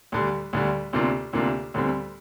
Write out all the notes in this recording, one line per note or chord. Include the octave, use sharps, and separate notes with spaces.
D2 D3 G3
D2 D3 G3
D2 C3 A#3 D4 F4
D2 C3 A#3 D4 F4
D2 D3 G3 C4